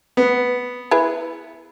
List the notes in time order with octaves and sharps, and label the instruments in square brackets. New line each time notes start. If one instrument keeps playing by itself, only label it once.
[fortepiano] B3
[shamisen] E4 G#4 B4